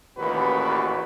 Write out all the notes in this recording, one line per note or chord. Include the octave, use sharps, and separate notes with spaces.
A1 D#2 A#2 C#3 F#4 B4